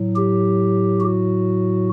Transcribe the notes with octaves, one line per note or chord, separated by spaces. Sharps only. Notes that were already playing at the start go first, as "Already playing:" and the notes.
Already playing: A2 F#3
G4
F#4